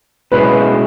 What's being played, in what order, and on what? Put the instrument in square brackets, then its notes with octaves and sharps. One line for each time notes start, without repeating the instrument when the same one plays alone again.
[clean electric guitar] B2 G#3 C#4 E4 [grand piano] B4